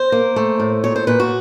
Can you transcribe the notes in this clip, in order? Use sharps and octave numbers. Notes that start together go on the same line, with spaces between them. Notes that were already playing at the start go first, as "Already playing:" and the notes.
Already playing: C5
A#3
A3
A2
A#2 C#5
C5
A#2 B4
F#4